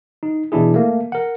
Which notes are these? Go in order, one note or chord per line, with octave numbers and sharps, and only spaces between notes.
D#4
B2 E3 D4 E4 G#4
A3 A#3
A#4 F#5